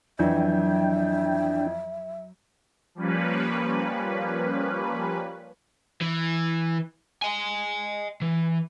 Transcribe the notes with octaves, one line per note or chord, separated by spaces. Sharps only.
F2 E3 F#3 D4 E5 G5
F3 G3 A#3 C#4 B4
E3
D#5 G#5
E3